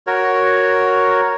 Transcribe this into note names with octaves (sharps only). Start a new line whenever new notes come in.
F#4 A#4 C#5